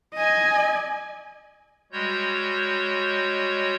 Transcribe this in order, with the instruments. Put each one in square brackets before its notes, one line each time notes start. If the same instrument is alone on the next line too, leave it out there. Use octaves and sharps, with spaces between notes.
[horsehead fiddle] D#5 G#5
[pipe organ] G3 G#3 F#4 C#5 G6